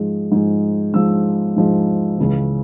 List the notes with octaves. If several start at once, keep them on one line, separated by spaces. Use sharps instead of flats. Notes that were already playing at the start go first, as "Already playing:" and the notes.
Already playing: G#2 F3 G#3
G#2 F3 G#3
G#2 F3 G#3 E6
G#2 F3 G#3
C#2 C#3 E3